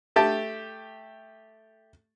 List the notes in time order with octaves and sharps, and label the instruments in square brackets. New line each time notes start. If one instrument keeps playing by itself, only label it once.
[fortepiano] A3 G4 A5